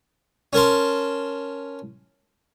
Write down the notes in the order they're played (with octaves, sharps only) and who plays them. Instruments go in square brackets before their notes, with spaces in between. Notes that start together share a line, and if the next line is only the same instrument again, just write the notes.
[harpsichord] C#4 A#4 A5 C6